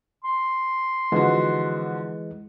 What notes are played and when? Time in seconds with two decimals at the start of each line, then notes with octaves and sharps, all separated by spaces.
0.24 C6
1.12 D3 E3 F3 G#3 F#4